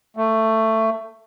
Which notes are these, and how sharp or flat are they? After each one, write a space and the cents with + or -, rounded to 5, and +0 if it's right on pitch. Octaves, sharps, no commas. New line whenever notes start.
A3 +15